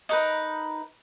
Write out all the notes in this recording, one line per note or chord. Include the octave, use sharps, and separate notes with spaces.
D#4 A#4 B4